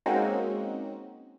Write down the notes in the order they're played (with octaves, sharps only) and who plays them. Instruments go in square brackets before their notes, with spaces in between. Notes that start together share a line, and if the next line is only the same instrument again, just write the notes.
[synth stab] G#3 A#3 C4 C#4 D#4 F#4